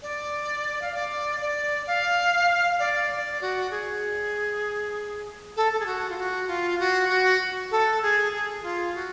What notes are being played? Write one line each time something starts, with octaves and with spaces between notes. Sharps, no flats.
D5
F5
D5
D5
F5
D5
D5
F#4
G#4
A4
A4
G#4
F#4
F4
F#4
F4
F#4
F#4
A4
G#4
G#4
F4
F#4